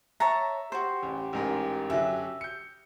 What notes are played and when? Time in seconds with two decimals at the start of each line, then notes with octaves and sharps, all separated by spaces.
0.20 C#5 E5 A5 A#5
0.72 F#4 G4 C5
1.03 A1
1.33 A1 G#2 A#4
1.90 F#2 D3 F#3 E5
2.41 G6 C#7